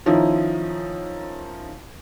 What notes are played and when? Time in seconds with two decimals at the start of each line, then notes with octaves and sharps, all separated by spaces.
0.06 D#3 F3 C#4 D#4 E4